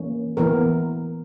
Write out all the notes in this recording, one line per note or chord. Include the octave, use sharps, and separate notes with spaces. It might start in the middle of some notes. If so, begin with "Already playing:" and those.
Already playing: E3 A#3 C#4
E3 B3 A#4